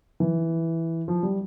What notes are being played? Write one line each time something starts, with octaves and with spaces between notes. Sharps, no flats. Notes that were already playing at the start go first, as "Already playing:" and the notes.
E3
F3
G3